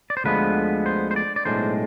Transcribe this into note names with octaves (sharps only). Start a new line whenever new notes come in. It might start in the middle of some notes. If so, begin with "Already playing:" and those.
D5
C5
D2 D3 F3 G#3 B3 B4
C5
C5
D5
D5
B1 A2 G#3 D4 C5